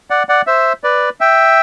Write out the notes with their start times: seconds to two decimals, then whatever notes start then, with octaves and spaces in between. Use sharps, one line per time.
0.10 D5 F#5
0.29 D5 F#5
0.47 C5 E5
0.84 B4 D5
1.20 E5 G5